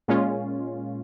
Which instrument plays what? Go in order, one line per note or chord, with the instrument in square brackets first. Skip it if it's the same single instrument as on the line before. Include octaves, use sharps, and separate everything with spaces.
[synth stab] A#2 G#3 C#4 F4